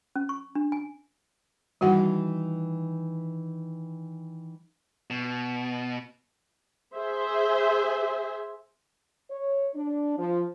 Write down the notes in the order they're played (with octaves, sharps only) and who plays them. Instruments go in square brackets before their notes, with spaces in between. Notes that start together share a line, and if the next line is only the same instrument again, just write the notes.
[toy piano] C#4
C#6
D4
G#5
[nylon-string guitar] D#3 E3 [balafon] G3 F#4 F#5
[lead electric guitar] B2
[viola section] G#4 C5 E5
[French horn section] C#5
D4
F3